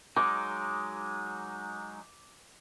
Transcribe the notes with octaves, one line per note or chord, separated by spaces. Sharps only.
F#3 G#3 D#4 D6